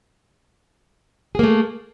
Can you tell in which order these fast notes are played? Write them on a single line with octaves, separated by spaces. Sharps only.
G#4 A#3 A3